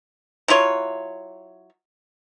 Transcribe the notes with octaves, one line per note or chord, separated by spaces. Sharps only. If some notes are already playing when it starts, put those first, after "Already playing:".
F#3 E4 F4 C#5